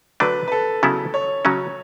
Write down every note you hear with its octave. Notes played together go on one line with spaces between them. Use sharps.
D3 F#3 A3 D4 B4
B4
A4
C#3 F#3 B3 E4
C#5
C#3 F#3 C#4